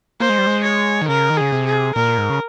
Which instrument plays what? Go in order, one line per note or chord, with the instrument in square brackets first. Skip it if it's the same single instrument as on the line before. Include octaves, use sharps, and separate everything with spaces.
[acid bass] A#3 [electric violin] C5
[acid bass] G#3
G3
G#3
[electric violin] C#5
[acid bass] D#3
[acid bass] C#3 [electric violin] A#4
[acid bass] D#3
[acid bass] C#3 [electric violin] G#4
[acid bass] C3
[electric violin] G#4
[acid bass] A#2 [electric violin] A#4
[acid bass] G#2
C#3